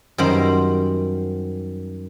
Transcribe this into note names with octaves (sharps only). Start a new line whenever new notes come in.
F#2 D#3 G3 C5 A#5 B5